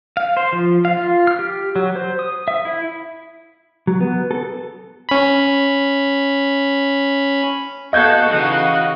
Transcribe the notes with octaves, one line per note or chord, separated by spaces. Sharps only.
F5
C5
F3
F5
F4
F6
G4
F#3
C5
D#6
E5
E4
F#3
B3
A4
C#4 B5
B3 F#4 A4 D#5 F5 F#5 G6 G#6
C#3 E3 D#4